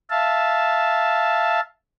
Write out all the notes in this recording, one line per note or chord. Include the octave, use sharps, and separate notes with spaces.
E5 F5 A5